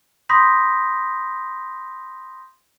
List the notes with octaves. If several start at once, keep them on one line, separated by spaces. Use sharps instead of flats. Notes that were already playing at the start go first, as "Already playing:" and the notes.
B5 C6 D#6 G6 A#6 B6